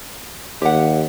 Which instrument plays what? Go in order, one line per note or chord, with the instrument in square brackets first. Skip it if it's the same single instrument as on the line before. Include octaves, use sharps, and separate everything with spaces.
[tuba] D#2 [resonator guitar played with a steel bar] G4 F#5